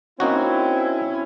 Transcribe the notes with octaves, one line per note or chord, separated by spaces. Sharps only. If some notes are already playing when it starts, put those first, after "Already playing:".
A#3 C4 C#4 D#4 E4 F#4